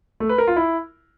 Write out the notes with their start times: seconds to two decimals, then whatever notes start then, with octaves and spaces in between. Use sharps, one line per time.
0.20 A3
0.29 B4
0.38 A#4
0.47 F4
0.56 E4